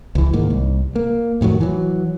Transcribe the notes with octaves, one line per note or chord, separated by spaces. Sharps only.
C#2 E3
G#2 D#3 A#3
C2
A#3
F2 A2 D#3 F#3
E3 F#3